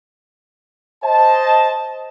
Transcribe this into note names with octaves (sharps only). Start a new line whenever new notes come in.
C5 D#5 A5